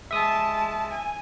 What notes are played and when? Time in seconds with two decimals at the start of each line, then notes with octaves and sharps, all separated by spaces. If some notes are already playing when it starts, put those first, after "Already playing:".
0.11 G#3 E5 A5 D#6
0.90 G#5